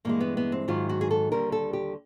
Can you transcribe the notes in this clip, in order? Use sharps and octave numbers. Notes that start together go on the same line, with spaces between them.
G2 E3 G#3 A#3
B3
B3
C4
G#2 D#3 F#3 F4
F#4
G#4
A4
D#2 D3 G3 A#4
A4
G4